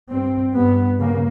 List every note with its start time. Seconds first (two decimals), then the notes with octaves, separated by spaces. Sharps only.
0.10 G2 C4
0.55 G2 B3
0.99 C#3 A#3